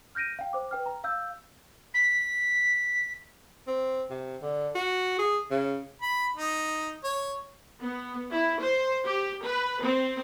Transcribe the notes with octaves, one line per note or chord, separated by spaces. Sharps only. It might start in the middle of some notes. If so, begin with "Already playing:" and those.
F6 G6 A#6 D7 D#7
F5 G5
C5 D6
B4 G5 F6
A#5
F5 E6 G6
B6
C4
C3
D3
F#4
G#4
C#3
B5
D#4
C#5
B3
E4
C5
G4
B4
C4